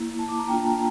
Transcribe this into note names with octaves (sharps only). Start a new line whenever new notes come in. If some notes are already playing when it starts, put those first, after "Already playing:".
Already playing: A#3 E4
A5
D6
A#5
A#3 D4 F4 G5
A5
A#5